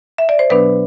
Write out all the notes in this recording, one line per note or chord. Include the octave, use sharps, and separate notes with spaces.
E5
D5
C5
B2 F#3 B3 D4 B4